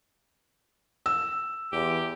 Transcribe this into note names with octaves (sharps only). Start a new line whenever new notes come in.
E6
E2 G4